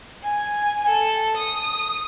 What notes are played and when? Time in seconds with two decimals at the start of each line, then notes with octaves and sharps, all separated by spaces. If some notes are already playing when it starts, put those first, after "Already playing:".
0.24 G#5
0.89 A4
1.37 D#6